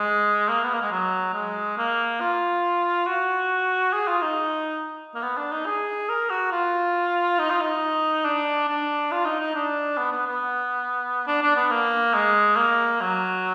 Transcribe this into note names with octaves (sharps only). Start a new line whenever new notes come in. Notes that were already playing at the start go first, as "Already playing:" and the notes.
Already playing: G#3
A#3
B3
A#3
G#3
F#3
G#3
A#3
F4
F#4
G#4
F4
D#4
A#3
B3
D4
D#4
G#4
A#4
F#4
F4
D#4
F4
D#4
D4
D4
F4
D#4
D#4
D4
B3
B3
B3
D4
D4
B3
A#3
G#3
A#3
F#3